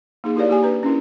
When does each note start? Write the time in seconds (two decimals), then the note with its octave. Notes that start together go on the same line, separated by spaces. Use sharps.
0.24 A#3 D#4 G#4
0.36 E4 G4 A#4 C#5 D5 F5
0.49 A#3 G4 G#5
0.62 D4 B4 A#5
0.83 C#4 D4 E4 A#4